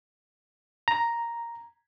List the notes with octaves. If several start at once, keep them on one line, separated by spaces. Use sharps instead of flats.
A#5